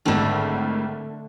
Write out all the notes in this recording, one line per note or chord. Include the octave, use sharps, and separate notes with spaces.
G#1 A2 D3 D#3 A3